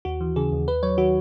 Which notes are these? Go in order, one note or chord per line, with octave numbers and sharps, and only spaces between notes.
D#2 F#4
E3
C#3 G#4
D#2
D#2 B4
F#3 C#5
D#3 F#4